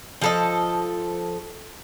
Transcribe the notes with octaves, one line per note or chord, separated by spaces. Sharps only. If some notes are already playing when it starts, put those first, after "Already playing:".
F3 A4 D#5